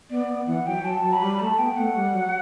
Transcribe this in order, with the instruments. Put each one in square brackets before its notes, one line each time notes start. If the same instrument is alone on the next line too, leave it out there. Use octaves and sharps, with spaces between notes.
[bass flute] B3 [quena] D5
[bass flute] B3
[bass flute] E3 [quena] F#5
[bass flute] F#3 [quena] G5
[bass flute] F#3 [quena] A5
[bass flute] F#3
[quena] B5
[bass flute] G3
[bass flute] A3 [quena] A5
[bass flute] B3 [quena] G5
[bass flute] A3 [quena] F#5
[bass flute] G3
F#3